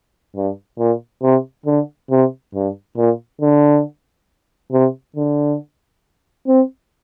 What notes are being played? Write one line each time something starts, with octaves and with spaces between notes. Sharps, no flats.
G2
A#2
C3
D3
C3
G2
A#2
D3
C3
D3
C4